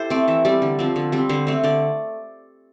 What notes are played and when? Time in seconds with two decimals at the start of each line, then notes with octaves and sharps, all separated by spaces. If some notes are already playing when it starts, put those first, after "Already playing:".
Already playing: E4 G4 A4 C5
0.10 A3 C4 D5
0.28 E3 E5
0.45 G3 C4 D5
0.62 D3
0.79 F3 C4
0.96 D3
1.12 G3 C4
1.29 D3 C5
1.47 A3 C4
1.64 D3 D5